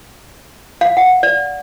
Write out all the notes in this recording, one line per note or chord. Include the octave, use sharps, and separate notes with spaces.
F5
F#5
D5